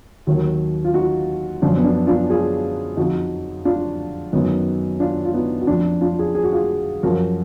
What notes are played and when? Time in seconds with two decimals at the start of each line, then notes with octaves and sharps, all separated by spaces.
0.27 D#2 D#3 F#3
0.85 F4
0.94 D#4 F#4
1.62 F#2 F3 D4 F4
1.77 B3
1.84 D4
2.07 D4 F4
2.30 F4 G#4
2.97 F2 F3 D#4 F#4
3.65 D4 F4
4.33 F#2 D#3 F#3 B3 D#4
5.00 D4 F4
5.25 F4
5.34 B3 D#4
5.61 F#4
5.67 F2 F3 D4 F4
6.01 D4 F4
6.18 F4 G#4
6.35 G#4
6.44 F#4
6.53 F4 G#4
7.03 F#2 F3 F#4 A#4